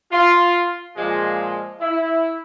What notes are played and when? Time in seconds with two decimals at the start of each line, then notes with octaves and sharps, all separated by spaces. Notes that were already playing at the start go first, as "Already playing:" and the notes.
0.12 F4
0.96 A#2 F3 G#3
1.80 E4